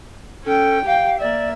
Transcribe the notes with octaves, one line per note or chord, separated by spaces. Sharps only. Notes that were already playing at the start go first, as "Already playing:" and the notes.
C#4 A4 G5
G4 F5 G5
A#3 D5 E5